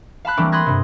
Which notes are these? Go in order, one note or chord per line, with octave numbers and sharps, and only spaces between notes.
F5 A5 B5 F#6
E3 G3 A3 A#3 C4 D4
B5 C6 D#6 F#6 G#6 A#6
G2 C3